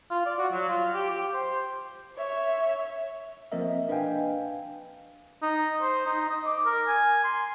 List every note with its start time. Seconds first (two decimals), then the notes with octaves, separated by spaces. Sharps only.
0.11 F4
0.26 D5
0.38 F#4
0.52 F#3
0.69 F4
0.94 G4
1.10 G4
1.34 C5
2.16 C#5 E5
3.52 F3 A#3 C4 A#4 D#5 E5
3.89 D4 B4 D#5 F5 G5 G#5
5.42 D#4
5.82 C5
6.06 D#4
6.29 D#5
6.45 D6
6.66 A#4
6.88 G#5
7.24 C6